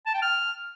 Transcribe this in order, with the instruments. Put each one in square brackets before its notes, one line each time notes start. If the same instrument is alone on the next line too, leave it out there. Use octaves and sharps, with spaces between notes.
[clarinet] A5
G5
F6